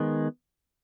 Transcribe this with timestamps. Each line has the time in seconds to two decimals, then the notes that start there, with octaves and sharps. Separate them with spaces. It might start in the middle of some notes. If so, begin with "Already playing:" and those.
Already playing: D#3 G#3 B3